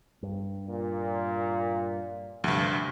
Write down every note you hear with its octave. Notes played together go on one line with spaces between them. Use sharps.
G2
A#2
D2 G2 C3 F3